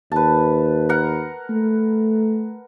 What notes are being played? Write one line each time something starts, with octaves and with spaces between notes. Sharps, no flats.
D#2 B4 A5
A#4 F#5
A3